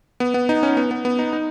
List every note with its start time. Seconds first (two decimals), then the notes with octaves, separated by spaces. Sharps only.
0.20 B3
0.34 B3
0.49 D#4
0.63 C#4
0.77 B3
0.91 B3
1.05 B3
1.19 D#4
1.33 D#4